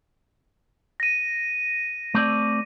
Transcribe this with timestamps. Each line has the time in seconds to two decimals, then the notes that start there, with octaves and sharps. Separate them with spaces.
1.00 A#6 D#7
2.14 A3 C4 D5